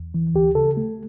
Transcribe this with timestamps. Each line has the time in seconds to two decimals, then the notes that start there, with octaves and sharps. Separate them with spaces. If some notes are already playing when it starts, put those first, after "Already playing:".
Already playing: E2
0.14 E3
0.34 D2 G4
0.55 C#3 A4
0.77 A3